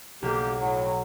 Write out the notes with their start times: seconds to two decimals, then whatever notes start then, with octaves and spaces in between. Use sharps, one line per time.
0.22 B1 A#3 G4
0.60 A2 F#3